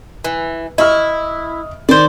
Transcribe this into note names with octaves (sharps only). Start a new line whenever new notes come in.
E3
E4 D#5 C#6 F6
D#3 C5 D5